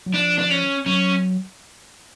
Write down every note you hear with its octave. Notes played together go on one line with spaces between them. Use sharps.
F#3
F3 D4
D4
C#4
F#3 C#4